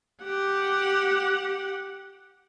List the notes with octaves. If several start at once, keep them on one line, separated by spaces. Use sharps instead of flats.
G4 F#5